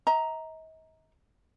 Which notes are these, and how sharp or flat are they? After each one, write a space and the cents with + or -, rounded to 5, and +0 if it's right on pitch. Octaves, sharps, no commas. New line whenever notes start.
D#5 +45 A#5 +0